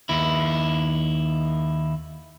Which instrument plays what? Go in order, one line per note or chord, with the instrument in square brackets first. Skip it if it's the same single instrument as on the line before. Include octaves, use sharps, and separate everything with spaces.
[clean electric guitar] D#2 E4